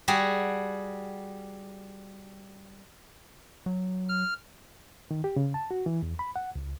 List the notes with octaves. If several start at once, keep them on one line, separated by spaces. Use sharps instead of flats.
G3 F#4 G#4
F#3
F6
D#3
G4
C#3
A5
F#4
E3
E2
B5
F#5
C#2